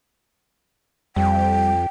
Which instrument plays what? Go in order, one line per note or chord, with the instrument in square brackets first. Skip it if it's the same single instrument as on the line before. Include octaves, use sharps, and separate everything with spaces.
[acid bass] F2 [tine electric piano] G3 [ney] G5